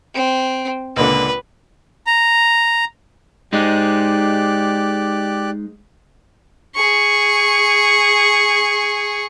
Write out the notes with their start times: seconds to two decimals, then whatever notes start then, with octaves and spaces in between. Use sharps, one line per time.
0.14 C4
0.96 C#2 A#2 D3 B4
2.07 A#5
3.53 G#3 D#4 G4 D5 F#6
6.75 G#4 C#6